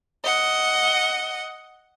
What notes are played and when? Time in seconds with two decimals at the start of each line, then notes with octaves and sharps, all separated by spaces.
0.24 D#5 F#5